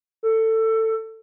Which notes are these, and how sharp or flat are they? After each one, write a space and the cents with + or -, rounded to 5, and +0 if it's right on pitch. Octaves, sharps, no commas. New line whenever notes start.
A4 +20